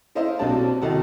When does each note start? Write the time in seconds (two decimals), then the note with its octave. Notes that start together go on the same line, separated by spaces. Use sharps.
0.15 D#4 E4 C5 D#5 F5
0.39 B1 F#3 G3 C4 D4 A5
0.82 C2 D#3 D#4 F#4 A4 A5